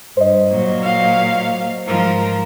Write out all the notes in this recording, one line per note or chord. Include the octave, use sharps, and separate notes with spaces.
G2 C5 D#5
A#2 F#3
F5
G#2 F3 A#4